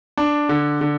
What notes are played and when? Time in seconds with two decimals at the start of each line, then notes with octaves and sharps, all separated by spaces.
0.18 D4
0.49 D3
0.81 D3